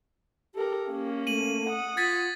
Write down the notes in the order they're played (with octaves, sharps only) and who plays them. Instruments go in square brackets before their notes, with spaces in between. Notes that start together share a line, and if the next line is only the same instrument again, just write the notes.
[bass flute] G4 [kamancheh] A4 A#4
[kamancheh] A#3 C#4
[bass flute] A3 [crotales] D#7 F#7
[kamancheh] F#5 D#6
[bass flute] F4 [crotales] G#6 A6 B6